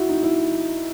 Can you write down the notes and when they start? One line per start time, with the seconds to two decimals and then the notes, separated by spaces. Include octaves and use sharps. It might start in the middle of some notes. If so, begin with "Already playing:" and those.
Already playing: E4 F#4
0.09 D#4
0.23 E4